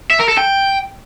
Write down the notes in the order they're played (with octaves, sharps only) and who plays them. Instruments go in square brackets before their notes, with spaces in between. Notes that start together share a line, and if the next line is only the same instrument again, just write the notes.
[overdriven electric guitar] E5
A#4
A4
G5